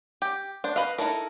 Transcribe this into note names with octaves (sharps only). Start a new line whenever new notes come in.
G4
D4 C5
B4 D#5 F5
D#4 E4 A4 A#4